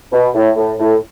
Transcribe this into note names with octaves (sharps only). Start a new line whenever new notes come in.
B2
A2
A2
A2